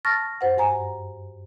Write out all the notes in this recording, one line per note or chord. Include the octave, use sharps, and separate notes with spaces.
A5 C#6 F6 A6 A#6
F#2 C5 F#5
G2 G#5 A#5